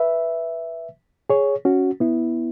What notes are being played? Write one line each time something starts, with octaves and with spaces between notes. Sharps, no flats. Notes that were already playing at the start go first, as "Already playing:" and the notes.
Already playing: B4 E5
G#4 C#5
C#4 F#4
B3 E4